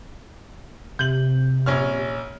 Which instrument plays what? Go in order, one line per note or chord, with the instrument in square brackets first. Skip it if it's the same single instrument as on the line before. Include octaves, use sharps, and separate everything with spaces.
[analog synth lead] C3 [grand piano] G6 F#7
[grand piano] A#1 C#4 F6